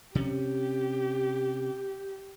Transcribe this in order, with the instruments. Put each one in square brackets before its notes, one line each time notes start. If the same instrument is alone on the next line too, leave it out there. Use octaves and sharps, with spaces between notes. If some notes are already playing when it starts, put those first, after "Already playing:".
[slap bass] C3 C#4 [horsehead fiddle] G4